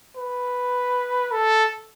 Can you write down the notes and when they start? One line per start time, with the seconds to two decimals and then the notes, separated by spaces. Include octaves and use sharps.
0.17 B4
1.32 A4